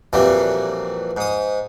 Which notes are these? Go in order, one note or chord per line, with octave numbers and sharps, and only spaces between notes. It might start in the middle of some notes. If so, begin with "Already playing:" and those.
F2 A#2 E3 F#3 G3
G#2 D#6